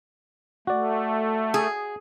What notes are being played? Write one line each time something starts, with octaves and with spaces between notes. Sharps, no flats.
A3 F#4 D5
G#4